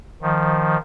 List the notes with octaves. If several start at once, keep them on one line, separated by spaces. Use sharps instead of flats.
D#3 F3